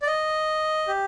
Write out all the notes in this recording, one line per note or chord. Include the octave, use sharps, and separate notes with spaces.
D5
D#5
G4